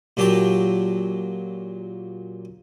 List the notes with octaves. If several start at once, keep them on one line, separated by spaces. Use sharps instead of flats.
A#2 F#3 G4 A5